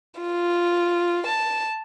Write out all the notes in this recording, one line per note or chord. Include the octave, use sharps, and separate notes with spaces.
F4
A5